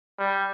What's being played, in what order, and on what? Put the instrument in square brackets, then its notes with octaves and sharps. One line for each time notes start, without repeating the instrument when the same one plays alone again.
[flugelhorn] G3